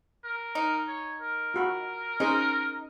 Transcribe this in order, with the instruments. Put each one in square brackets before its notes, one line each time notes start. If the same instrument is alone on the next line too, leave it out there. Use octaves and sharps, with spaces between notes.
[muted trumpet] A#4
[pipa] D#4
[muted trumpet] C#5
A#4
[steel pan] F4 F#4 B5
[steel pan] C#4 G#4 C5 [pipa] D#4